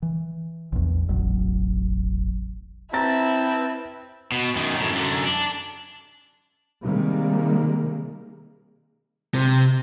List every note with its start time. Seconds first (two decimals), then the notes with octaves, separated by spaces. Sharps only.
0.02 E3
0.72 A#1 E2
1.08 E1 A1 F#3
2.93 C4 E4 B4 A5 A#5 A6
4.32 B2
4.55 F#2 D#3
4.76 F#2 A2
4.93 F#2 D3
5.25 D4
6.83 C3 D#3 G3 G#3 A#3
9.34 C3